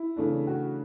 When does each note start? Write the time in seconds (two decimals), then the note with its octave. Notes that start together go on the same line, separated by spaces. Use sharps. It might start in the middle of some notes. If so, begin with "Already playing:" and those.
Already playing: E4
0.16 C#3 E3 A3 D4
0.47 F#4